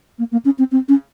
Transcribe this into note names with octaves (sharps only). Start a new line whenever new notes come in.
A#3
A#3
C#4
C4
C4
C#4